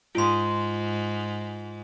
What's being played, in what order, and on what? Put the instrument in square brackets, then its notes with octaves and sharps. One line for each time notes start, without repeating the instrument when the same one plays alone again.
[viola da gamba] G#2 [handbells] F4 C6